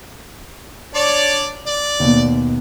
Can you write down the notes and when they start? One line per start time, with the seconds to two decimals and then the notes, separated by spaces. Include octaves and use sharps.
0.95 D4 C#5 D5
1.66 D5
2.00 D#2 B2